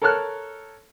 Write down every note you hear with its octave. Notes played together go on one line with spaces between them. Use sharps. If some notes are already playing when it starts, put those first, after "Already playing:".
A4 A#4 C#5 A5 F6 F#6